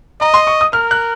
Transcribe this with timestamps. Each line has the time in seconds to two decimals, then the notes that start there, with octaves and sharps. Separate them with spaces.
0.21 D#5 A#5
0.34 C6
0.47 C#6
0.61 D#6
0.73 A#4 F6
0.91 F#6